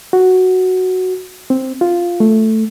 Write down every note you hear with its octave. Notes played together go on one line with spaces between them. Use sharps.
F#4
C4
F4
A3